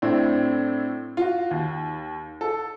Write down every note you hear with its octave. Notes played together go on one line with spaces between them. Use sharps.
A2 C4 D4 E4
F4 F#4
D#2
A4